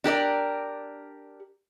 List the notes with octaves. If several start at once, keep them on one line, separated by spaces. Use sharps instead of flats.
D4 G4 A#4 D5